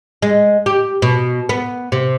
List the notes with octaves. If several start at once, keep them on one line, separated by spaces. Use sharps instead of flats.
G#3
G4
B2
B3
C3